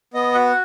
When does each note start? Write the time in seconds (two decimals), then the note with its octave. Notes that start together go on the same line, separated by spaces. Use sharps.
0.14 B3 D#5
0.34 F#4 F#5